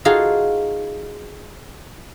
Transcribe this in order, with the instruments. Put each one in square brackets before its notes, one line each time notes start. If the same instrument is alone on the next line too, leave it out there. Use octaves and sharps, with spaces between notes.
[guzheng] D#4 F4 F#4 G#4 A4 F5